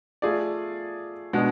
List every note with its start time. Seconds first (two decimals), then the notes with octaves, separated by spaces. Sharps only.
0.22 A3 F4 G#4 D5
1.33 B2 G#3 B3 D4 F#4